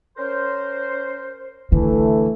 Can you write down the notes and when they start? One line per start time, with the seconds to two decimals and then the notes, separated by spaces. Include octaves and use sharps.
0.18 C#4 A#4 C5
1.72 D3 E3 A3